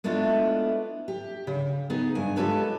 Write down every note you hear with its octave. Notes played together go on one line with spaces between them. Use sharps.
G#3 A3 B3 D4 E4 F4
G4
C#3
B3 D#4 G#4
G2 G#5
G#3 F4 G4 A4 B4 C#5